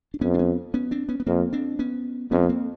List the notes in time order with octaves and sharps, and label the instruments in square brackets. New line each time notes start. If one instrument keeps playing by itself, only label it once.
[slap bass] D4
[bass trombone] F2 [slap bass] B3 C#4
[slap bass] D4
B3 C#4
B3 C#4
C4 D4
B3 C#4
B3
[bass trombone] F2 [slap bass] A#3 C4
[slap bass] C4 D4
B3 C#4
[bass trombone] F2 [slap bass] B3 C#4
[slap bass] B3
A#3 C4